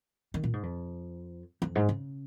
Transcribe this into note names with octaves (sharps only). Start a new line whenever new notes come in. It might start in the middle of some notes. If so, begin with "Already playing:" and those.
D#3
A#2
G#2
F2
F2
G#2
C#3